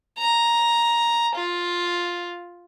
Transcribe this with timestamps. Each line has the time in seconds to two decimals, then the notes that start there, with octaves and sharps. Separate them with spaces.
0.19 A#5
1.36 F4